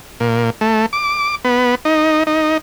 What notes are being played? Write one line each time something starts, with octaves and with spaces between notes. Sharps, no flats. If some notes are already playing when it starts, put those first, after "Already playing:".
A#2
A3
D6
B3
D#4
D#4